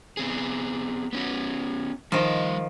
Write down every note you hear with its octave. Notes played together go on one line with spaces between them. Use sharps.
B3 C4 G#4
B3 C#4 F#4
D#3 F3 G3 D#5